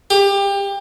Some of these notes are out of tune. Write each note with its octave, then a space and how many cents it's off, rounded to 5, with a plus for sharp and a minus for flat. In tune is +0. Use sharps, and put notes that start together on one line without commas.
G4 +25